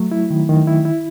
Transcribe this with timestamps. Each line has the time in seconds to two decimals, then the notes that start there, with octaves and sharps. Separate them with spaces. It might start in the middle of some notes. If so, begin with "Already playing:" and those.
Already playing: F#3 A3
0.11 E4
0.30 D#3
0.49 D#3
0.67 E4
0.85 E4